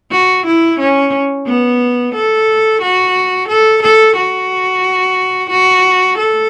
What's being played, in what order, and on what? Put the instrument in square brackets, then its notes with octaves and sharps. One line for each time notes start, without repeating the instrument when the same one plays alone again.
[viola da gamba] F#4
E4
C#4
B3
A4
F#4
A4
A4
F#4
F#4
A4